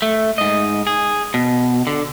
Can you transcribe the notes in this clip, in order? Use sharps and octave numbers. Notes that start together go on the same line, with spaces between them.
A3
G#2 D#5
G#4
B2
D3